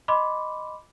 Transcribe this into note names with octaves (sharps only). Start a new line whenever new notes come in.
D#5 B5 C6 D6